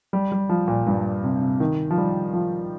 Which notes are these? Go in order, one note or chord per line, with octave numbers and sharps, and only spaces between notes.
G3
G3
F3
A#2
G2
C3
C3
D#3
F3
G3
F3